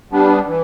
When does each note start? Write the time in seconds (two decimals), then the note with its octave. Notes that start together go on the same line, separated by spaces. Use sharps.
0.12 G3 B3 D4
0.47 E3